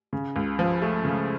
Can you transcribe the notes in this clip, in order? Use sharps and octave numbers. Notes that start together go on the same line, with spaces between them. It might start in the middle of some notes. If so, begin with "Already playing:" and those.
C#3
C#2
F3
A3
C#3